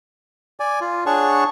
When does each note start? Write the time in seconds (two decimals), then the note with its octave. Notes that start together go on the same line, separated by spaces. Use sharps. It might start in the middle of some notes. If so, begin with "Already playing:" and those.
0.60 D5 G#5
0.81 F4
1.06 D4 G#4 C#5 F#5 A5 C#6